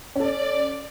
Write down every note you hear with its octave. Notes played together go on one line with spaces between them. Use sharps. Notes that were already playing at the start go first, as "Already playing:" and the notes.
C#4 A4 D5